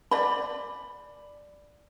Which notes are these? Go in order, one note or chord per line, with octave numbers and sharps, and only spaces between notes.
D5 B5